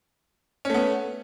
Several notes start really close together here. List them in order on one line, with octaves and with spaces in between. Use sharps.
C#4 A3 B3